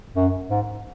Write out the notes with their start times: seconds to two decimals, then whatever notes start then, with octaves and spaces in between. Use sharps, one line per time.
0.16 F#2
0.50 G#2